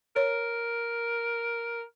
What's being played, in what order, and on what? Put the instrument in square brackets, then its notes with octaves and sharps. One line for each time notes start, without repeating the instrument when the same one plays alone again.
[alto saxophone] A#4 [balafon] C#5